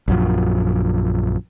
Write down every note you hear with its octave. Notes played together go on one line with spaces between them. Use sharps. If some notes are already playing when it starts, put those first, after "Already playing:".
A#1 F#2 F3